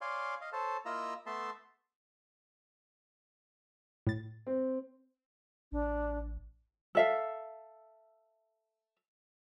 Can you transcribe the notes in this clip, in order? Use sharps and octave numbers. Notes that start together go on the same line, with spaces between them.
C#5 D5 F5 G#5 C6
D#5 F5
A4 C5 C#5 A5
A#3 E4 F4 D#5 A#5 E6
A3 B3 E5 A5 C6
A2 A6
C4
A1 D4
A4 E5 F5